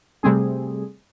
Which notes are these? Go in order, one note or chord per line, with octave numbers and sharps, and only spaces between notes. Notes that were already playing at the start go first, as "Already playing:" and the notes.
C3 G3 A3 C4 G#4